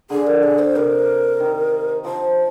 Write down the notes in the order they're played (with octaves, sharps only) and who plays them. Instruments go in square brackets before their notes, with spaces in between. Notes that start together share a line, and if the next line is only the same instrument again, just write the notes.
[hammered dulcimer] D3 [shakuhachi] G#4
[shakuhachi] A#4
G#4
C5
[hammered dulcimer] C3 [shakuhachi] A#4
[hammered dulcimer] D#3
[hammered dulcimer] F3 [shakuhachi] C5